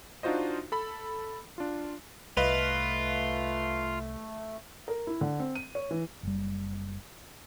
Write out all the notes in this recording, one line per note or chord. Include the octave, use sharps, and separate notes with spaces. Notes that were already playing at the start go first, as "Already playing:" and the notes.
D4 D#4 F4 F#4 C5 D#5
A4 B5
D4 F4
C2 A3 F4 B4 D#5 F5
A#4
E4
D3
C4
D#7
C#5
E3
F#1 G3